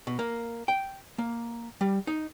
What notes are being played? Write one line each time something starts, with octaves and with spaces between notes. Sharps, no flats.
B2
A#3
G5
A#3
G3
D#4